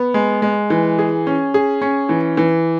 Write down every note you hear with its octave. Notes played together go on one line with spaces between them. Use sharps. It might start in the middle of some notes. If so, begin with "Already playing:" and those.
Already playing: B3
G#3
G#3
E3
G#4
C#4
G#4
C#4
E3
E3